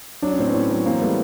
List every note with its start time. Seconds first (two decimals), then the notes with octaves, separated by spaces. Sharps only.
0.22 F#3 D4
0.32 C#4
0.39 A2 C4
0.49 B3 C#4
0.54 A2
0.70 F#3
0.85 E3 A#3 C4
1.01 G3 A3 B3